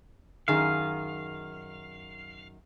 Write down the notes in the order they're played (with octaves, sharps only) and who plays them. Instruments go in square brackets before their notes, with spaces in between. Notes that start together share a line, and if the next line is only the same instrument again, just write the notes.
[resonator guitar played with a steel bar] F#2 D#3 G#4 [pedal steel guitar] F5